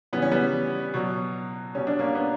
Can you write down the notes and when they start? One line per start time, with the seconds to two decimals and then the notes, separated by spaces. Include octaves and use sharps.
0.13 C#3 E3 G3 B3
0.22 C#4
0.31 G3 B3
0.94 B2 F#3
1.75 B2 G3 C#4
1.87 D4
1.99 A#3 C#4
2.15 B3 D4